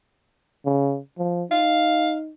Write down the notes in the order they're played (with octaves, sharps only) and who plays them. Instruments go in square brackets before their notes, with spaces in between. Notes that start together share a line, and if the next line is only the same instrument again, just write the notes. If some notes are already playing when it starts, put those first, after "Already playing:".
[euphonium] C#3
F3
[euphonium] D#4 [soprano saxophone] F5